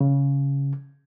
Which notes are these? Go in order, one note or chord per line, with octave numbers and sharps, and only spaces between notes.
C#3